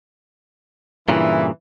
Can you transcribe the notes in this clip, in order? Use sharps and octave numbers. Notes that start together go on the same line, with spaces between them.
G2 A#2 C#3 E3